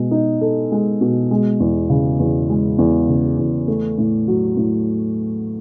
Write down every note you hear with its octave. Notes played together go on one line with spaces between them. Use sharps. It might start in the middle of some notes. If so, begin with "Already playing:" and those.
Already playing: B2 G#3
D#4
A4
G#3
B2
G#3
E2
C#3
E2
G#3
E2
C#3
E2
A3
A2
F#3
A2